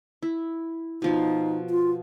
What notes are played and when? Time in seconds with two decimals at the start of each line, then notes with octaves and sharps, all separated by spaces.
0.23 E4
1.02 B2 F3 D#4 F5
1.70 F4